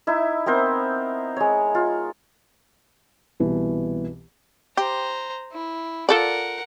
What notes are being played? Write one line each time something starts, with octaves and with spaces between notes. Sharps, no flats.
D#4 E4 E5
B3 C4 A#4 C5
G#3 C#5
F4
C2 B2 E3
G4 C5 A#5
E4
F4 A4 A#4 D5 F#5